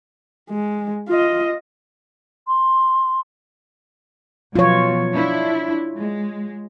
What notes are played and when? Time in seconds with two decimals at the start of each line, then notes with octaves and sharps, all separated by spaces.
0.50 G#3
1.09 F4 D#5
2.48 C6
4.56 B2 F3 F#3 F4 C#5
5.14 D4 E4
5.97 G#3